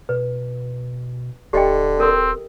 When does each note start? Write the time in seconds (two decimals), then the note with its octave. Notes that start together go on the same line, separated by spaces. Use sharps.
0.09 B2 B4
1.53 D#1 D3 G4 D#5 G5
2.00 C4 A4 A#4